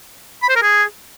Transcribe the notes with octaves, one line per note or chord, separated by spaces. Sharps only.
B5
C5
A#4
G#4